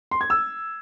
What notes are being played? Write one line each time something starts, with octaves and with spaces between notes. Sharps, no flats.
C6
G#6
E6